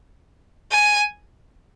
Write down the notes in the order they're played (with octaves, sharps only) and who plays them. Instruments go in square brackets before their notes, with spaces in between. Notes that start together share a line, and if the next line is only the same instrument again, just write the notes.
[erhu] G#5